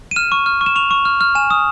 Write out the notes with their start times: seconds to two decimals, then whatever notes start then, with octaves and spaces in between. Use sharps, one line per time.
0.11 D#7
0.16 F6 E7
0.32 C#6
0.46 F6
0.61 C#6
0.66 E7
0.76 C#6 F7
0.91 C#6
1.05 F6
1.21 F6
1.35 G#5 E7
1.50 D#6